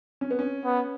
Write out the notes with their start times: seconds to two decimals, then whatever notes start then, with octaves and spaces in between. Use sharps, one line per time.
0.21 C#4
0.31 B3
0.39 C#4
0.65 B3